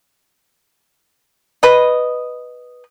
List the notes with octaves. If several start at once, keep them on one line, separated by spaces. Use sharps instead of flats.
B4 D#5